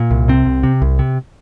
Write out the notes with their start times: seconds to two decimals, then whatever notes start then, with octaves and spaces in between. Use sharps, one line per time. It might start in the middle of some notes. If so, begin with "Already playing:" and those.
Already playing: A#2
0.11 C2
0.28 C3 C4
0.46 C2
0.63 C3
0.82 C2
0.99 C3